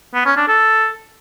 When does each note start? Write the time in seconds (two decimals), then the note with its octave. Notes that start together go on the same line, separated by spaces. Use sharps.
0.14 B3
0.26 C#4
0.37 D4
0.48 A4